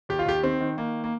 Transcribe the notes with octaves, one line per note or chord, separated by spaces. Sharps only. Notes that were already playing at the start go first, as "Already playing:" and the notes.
D#2 G4
F4
D#2 G4
D#3 C4
D#3
D#3 A#3
A#3